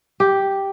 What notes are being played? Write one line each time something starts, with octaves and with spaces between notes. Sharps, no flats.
G4